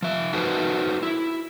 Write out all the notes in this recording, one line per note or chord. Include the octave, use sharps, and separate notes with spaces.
F3 E5
D#4 F#4 A4 B4 C5
E4